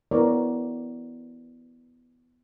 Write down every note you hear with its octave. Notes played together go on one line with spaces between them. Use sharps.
B3 E4 A#4 C#5 D5